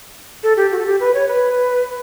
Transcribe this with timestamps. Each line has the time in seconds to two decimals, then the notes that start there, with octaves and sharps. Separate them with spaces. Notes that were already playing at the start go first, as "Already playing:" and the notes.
0.43 A4
0.57 G4
0.71 F#4
0.79 A4
0.86 G4
1.00 B4
1.14 C#5
1.28 B4